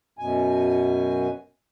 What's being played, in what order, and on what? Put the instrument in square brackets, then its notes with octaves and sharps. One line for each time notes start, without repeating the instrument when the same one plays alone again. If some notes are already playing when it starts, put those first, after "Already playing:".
[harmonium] F#2 B2 G#5